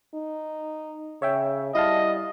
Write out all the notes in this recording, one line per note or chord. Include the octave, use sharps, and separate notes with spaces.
D#4
C#3 C#5 E5 G5
G3 E4 D#5 F5 A5